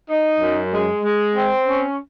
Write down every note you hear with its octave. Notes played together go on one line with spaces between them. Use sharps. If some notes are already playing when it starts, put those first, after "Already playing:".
D#4
F#2
G#3
G#3
C4
C#4